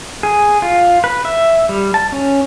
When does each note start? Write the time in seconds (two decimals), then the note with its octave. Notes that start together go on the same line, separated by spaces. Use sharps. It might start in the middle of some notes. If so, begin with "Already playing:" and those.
0.23 G#4
0.62 F4
1.04 B4
1.25 E5
1.69 G3
1.94 A5
2.12 C#4